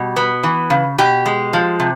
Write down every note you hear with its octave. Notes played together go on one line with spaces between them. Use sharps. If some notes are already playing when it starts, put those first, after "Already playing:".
Already playing: B2 G3
B3
E3
C#3
B2 G4
G#3
F3
C3